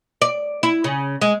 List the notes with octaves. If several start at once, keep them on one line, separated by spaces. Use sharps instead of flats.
D5
E4
C#3
G#3